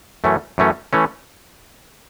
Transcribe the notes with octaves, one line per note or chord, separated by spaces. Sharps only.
F#2 E3 A3 C#4
F#2 E3 A3 C#4
E3 A3 C#4